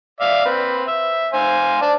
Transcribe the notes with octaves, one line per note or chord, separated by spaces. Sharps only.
D5 E5 F5
C4 B4
E5
C5 F5 G#5
D5 A5